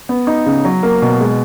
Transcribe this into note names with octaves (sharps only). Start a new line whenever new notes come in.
B3
D#4
C#3
F#3
A#3
B2
G#3